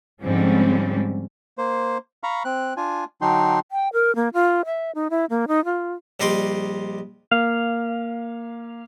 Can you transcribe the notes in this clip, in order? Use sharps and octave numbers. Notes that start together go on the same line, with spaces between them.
G#2 D3 F3 G3 C4 C#4
A#3 C5
F5 A#5 B5 C#6
C4 F#6
D4 F4 G#5
D3 F#3 D4 D#4 G5 C6
G5
A#4
A#3
F4
E5
D#4
E4
A#3
D#4
F4
A#1 G3 D#4 D5 C6
A#3 F5